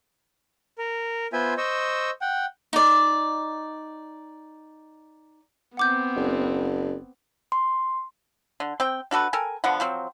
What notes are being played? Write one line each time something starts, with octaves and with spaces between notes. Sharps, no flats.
A#4
B3 F4 C5 E5 G#5
C5 D#5 C#6 E6
F#5 G5
D#4 D5
B3 C4 F#5 D6 G6
F#1
C6
D3
C4 G5
D4 F#4 A4 B4
A4 A#4 G5 G#5
D3 F3 B3 F#5
F3 F#3 C4